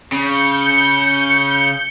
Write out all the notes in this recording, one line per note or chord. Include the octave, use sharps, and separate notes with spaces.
C#3 G6 C#7